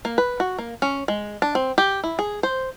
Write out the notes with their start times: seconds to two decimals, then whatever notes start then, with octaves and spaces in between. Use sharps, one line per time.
0.05 A#3
0.18 B4
0.40 F#4
0.58 A#3
0.82 C#4
1.08 G#3
1.42 D4
1.55 C4
1.78 G4
2.04 E4
2.19 G#4
2.43 C5